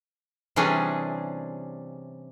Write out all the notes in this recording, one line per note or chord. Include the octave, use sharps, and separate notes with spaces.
C3 E3 G3 C#4 D4 G#4